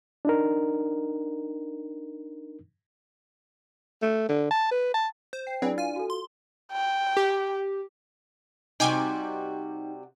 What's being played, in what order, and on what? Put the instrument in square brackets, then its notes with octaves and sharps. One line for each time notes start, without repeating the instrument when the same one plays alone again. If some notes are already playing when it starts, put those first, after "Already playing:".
[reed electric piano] D4 D#4 A#4
[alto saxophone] A3
D3
A5
B4
A5
[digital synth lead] C5
[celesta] G5 [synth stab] C7
[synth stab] F#3 G#4 B4 [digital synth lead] C4 [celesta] D4 E4 D5
[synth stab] F4 [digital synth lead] G#5
[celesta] F#4 A4
[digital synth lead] C6
[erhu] G5
[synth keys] G4
[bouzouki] C3 G3 F#4 [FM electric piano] D#4 [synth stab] G5 G#5 D6